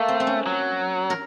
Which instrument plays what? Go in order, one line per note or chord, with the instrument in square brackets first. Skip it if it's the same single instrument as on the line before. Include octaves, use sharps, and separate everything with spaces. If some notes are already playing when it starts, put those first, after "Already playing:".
Already playing: [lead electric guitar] A3 [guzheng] A#3
[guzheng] C4
C4
C#4
[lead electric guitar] F#3
[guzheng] A#4